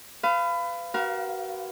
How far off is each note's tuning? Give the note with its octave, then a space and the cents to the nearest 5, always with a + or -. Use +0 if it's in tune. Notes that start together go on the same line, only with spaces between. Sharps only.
B4 +25 F5 -20
F#4 +30 A#4 +35 F5 +5